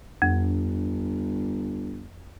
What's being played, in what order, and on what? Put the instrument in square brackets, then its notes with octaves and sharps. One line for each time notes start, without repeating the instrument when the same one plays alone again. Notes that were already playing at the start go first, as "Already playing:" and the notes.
[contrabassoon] G1 [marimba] F2